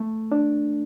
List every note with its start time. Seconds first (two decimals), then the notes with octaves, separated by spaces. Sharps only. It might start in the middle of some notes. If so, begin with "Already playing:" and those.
Already playing: A3 A4
0.32 D4